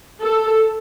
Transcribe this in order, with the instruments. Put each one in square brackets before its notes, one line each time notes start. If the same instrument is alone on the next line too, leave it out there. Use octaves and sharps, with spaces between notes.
[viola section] A4